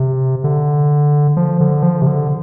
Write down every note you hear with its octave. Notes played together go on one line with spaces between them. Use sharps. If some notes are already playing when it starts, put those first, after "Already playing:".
Already playing: C3
D3
F3
D3
F3
C3
D3